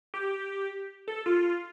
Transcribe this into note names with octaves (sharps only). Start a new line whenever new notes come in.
G4
A4
F4